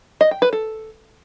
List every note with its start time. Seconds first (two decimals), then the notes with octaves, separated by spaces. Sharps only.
0.21 D#5
0.31 G5
0.42 B4
0.53 A4